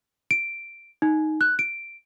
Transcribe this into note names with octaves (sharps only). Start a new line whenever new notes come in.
D7
D#4
F#6
D7